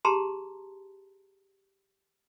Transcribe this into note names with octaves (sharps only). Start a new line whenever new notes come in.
G4 G#4 A5 A#5 C6